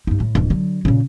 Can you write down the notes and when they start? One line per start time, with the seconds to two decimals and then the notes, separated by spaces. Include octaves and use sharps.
0.07 G2 D#4
0.20 A2
0.35 D1 F2
0.50 D3 F#3
0.85 A#2 C#3